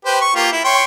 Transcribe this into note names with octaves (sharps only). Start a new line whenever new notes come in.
G4 B4 C5
C#6
A#3 F4 G4
E4
C#5 G5 C6